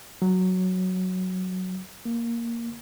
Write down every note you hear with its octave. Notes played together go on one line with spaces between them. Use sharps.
F#3
A#3